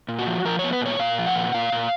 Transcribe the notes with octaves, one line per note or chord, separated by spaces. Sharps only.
A#2
F#4
F3
F3 A#4
B3 C#5
B4
A#2 C#5
A#2 F5
F3
F#5
A#2
A#2 F5
A#2